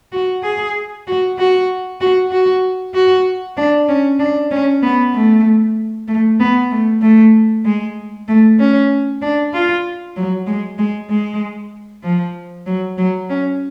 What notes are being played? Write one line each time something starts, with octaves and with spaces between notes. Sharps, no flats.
F#4
G#4
F#4
F#4
F#4
F#4
F#4
D4
C#4
D4
C#4
B3
A3
A3
B3
A3
A3
G#3
A3
C#4
D4
F4
F#3
G#3
G#3
G#3
F3
F#3
F#3
C#4